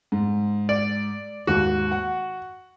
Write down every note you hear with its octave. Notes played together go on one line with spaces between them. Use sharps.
G#2
D5
D#2 G#2 F#4
F#5